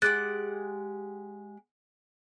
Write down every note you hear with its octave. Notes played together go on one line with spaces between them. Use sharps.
G#3 G4 F#5 F#6 A6